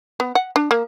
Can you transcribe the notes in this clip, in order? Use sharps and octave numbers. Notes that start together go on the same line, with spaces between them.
B3
F#5
D4
A#3